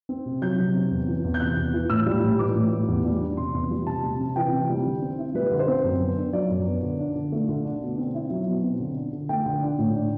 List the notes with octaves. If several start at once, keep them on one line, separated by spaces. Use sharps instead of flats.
C4
C3
F#3 G6
C3
C4
E2
E3
E2
G6
C3 F#6
E2
E3
A2 E6
G3
A2
E3 D6
A2
G3
E2
G3
D4
C3 C6
E2
G3
C3 A5
G3
C3
E3 G5
C3
G3
D3
C4
E4
G3 B4
D3
C5
C4
F#2
B3
D4
F#3 D5
F#2
B3
D3
D4
D3
A3
D3
D4
B2
C4
E4
F#3
B2
C4
D3
D4
D3
A3 G5
D3
D4
A2
D4